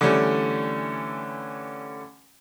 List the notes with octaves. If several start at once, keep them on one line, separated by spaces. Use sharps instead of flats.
D3 E3 G3 A3 C#4